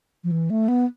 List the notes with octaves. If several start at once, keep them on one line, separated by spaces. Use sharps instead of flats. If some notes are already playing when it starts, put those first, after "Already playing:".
F3
E3
A3
B3